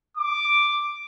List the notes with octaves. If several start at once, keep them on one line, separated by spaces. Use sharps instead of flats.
D6